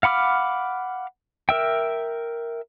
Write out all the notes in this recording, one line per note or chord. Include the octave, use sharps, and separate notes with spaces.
F5 F#5 B5 D6 F6
A#4 E5 G5